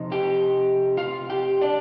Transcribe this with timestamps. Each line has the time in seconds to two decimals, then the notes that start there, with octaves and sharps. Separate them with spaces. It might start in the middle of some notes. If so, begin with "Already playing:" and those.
Already playing: C3 F3 D#4
0.12 G4 G5
0.97 F4 F5
1.30 G4 G5
1.61 D4 D5